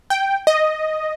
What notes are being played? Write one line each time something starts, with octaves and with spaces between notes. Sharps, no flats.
G5
D#5